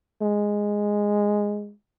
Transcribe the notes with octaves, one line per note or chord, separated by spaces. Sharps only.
G#3